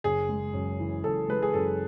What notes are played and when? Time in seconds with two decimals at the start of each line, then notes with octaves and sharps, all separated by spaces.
0.04 F#1 G#4
0.29 G#3
0.53 F#2
0.80 E3
1.04 F#1 A4
1.28 G#3 B4
1.42 G#4
1.54 F#2 A4